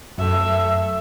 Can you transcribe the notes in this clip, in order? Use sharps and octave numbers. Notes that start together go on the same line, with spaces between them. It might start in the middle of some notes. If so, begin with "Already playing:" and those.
F#2 A3 E5